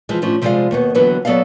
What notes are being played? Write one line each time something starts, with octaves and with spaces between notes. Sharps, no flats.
E3 F3 G#3
A2 F3 C#4 D4
C3 F3 G3 G#3 D5 F5
D#2 B2 B3
D#2 D3 E3 F#3 B3 B4
F#3 B3 A4 D5 D#5 F5